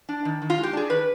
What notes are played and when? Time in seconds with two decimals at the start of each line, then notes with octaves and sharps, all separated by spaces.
0.09 D4
0.25 D#3
0.42 D#3
0.50 F4
0.58 G#3
0.63 G4
0.73 D4 G#4
0.89 D#3 B4